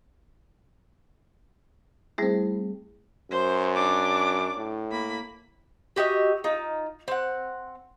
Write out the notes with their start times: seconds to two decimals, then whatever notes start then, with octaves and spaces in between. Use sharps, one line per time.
2.18 G3 A3 C4 E4 G#4
3.31 F#2 C5
3.75 D4 D6
4.57 A2
4.91 A#3 B5
5.96 F#4 G4 D#5 E5
6.44 D#4 F4
7.08 C4 F#5